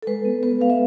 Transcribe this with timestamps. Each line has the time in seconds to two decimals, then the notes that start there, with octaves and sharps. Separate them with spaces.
0.02 A4
0.07 G#3 B4
0.25 B3
0.43 B3 B4
0.60 G#3 F5
0.70 E5